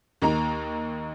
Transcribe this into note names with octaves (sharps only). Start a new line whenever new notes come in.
D#2 A#3 D#4 A#5